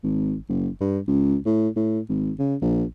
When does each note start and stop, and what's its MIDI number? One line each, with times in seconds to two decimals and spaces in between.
0.04 0.36 32
0.49 0.69 30
0.81 0.99 43
1.07 1.37 37
1.46 1.68 45
1.76 2.00 45
2.09 2.31 32
2.39 2.56 49
2.62 2.84 34